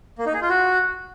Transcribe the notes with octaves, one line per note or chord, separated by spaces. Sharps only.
A#3
D#4
G#4
F4
F#4